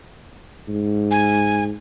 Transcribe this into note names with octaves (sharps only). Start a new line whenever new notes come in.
G#2
G#5